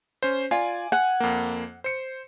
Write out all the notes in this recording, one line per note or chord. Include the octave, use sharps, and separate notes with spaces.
C#4 C5
F4 D5 G#5
F#5 G#5
F2 A#3
C5 C#7